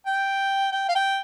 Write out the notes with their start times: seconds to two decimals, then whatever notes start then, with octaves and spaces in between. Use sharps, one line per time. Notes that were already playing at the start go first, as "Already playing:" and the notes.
0.06 G5
0.72 G5
0.88 F5
0.95 G5